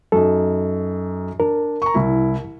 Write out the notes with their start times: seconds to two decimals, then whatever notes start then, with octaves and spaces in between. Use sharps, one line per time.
0.12 F#2 D#4 A4
1.40 D4 A#4
1.82 A#5 C#6
1.94 C2 E4